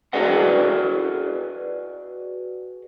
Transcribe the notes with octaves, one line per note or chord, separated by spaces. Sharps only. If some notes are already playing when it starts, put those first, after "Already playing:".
F#4 G#4 B4 D5 D#5 F#5